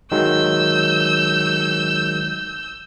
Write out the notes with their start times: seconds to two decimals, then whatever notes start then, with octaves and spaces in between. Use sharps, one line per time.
0.12 D#3 F#3 G#3 E6 G6